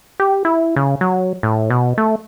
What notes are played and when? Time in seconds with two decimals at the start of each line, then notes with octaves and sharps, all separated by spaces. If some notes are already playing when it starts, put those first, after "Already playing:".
0.20 G4
0.45 E4
0.76 C#3
1.01 F#3
1.43 A2
1.70 B2
1.98 A3